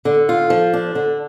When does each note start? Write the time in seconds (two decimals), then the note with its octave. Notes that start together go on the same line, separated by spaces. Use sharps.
0.05 D3
0.29 F4
0.50 F3
0.73 D4
0.95 D3